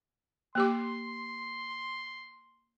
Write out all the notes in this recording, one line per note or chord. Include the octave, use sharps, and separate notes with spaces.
A#3 G4 C6 D6